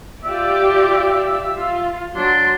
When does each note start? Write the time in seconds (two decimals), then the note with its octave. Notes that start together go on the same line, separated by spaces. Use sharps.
0.24 F4 G4 D5 E5
1.55 F4
2.16 F#3 D4 C6